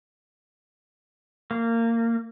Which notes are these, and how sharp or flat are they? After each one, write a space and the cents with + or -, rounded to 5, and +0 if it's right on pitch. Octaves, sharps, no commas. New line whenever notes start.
A#3 -20